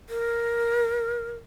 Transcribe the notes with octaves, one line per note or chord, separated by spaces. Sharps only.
A#4